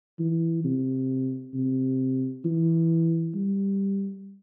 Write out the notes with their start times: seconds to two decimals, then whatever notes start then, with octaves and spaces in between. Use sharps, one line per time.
0.19 E3
0.64 C3
1.54 C3
2.45 E3
3.35 G3